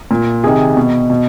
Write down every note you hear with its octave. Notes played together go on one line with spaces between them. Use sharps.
A#2
C3 D#3 G#4
B2
B2